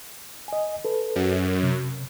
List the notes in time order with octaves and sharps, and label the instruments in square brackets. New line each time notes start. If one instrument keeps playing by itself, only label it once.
[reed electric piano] D#5 G#5
A4 B4
[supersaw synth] F#2
[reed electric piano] C3